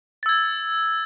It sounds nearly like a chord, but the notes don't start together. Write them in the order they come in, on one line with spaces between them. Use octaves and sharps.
A6 E6 G#6